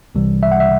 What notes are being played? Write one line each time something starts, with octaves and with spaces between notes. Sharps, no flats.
C2 C3 E3 G3
E5
F#5
E5